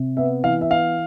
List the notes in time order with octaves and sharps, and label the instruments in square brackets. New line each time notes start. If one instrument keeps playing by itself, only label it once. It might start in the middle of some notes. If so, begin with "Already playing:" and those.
Already playing: [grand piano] C3
B3 E5
E3 F5
E5
B3 F5